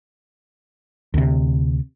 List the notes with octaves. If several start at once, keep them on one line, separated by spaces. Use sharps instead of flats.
D2 C3